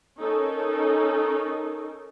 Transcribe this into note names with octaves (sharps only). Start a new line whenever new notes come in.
C#4 D#4 A4 A#4